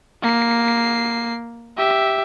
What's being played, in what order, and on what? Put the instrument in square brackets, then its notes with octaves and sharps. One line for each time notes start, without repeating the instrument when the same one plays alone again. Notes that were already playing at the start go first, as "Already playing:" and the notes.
[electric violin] A#3 C7
G4 E5